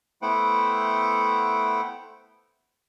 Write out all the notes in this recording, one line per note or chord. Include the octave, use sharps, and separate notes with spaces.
A3 B3 E4 C5 F#5 G5